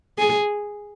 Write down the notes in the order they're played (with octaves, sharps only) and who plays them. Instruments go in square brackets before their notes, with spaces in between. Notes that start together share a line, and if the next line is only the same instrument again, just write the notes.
[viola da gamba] G#4